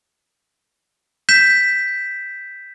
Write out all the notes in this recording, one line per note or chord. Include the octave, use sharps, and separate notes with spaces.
G6 B6 E7